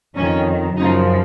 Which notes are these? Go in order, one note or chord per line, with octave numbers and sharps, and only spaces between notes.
F2 D#3 C#4
F#2 C#3 F3 D#4